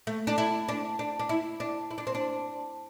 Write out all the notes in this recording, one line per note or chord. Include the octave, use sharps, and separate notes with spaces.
A3
D4
E4
D4
D4
D4
E4
D4
E4
D4
C4
D4